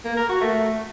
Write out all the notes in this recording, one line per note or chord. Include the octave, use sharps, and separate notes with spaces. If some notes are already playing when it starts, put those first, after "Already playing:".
A#3
A#4
F#4
A3